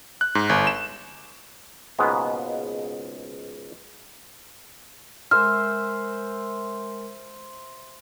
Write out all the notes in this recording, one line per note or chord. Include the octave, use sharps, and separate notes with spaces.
F#6
G#2
G1
E7
C#2 G#2 B2 G#3 A#3 B3
G#3 A#4 C5 E5 F6